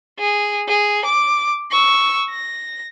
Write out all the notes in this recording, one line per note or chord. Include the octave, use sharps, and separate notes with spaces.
G#4
G#4
D6
C#6 E6
A#6